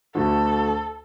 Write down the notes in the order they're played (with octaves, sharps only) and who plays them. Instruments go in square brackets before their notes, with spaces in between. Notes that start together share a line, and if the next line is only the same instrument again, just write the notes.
[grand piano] D2 D3 A3 D4 F#4 [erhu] A4